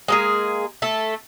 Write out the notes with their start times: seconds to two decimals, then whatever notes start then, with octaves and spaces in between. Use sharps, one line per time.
0.08 G#3 A#3 G#4
0.82 A3 A4